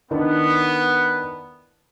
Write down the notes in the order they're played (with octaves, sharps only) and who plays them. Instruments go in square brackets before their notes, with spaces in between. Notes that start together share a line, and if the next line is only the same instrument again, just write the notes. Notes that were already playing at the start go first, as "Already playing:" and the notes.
[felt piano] D#3 D4 E4 [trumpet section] B3